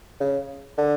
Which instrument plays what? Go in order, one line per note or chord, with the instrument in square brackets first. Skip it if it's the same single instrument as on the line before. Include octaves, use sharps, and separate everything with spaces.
[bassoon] C#3
D3